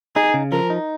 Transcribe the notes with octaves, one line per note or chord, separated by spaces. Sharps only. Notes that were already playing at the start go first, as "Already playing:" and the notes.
D#4 G#4
C#3
F3 A#4
D#4